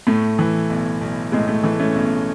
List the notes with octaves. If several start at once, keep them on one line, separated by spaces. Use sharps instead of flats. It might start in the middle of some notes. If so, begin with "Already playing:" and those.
A2 A3
E3
B1
B1
A2 G#3
A3
E3 A3
A3 C#4
B1